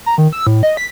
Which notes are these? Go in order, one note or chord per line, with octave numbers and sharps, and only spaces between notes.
A#5
D#3
E6
A2
D#5
B6